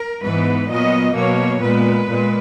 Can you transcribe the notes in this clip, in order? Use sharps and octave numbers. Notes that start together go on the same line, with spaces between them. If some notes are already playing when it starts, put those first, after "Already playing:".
Already playing: A#4
G#2 E3 B3 B4
A#2 F#3 B3 D#5
B2 F#3 A#3 C#5
A#2 G#3 B3 B4
A#2 G#3